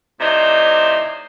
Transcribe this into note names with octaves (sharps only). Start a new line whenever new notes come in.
A2 C3 D#4 C5 D5 E5